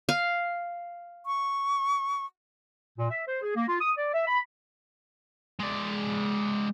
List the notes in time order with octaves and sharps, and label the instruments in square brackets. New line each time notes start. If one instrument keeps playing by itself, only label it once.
[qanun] F5
[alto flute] C#6
[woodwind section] A#2
E5
C5
G#4
A#3
F4
D#6
D5
E5
B5
[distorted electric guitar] G#3 D5